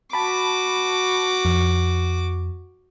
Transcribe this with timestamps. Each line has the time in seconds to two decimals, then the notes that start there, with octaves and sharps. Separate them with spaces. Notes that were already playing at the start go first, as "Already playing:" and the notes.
0.13 F#4 A5 B5 D6
1.45 F2